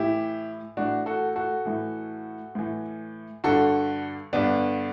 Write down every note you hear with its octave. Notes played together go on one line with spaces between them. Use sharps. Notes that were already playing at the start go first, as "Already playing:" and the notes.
Already playing: A2 E3 E4 G4
A2 E3 D4 F#4
F#4 A4
F#4 A4
A2 E3
A2 E3
G2 D3 F#4 A4
G2 D3 B3 D4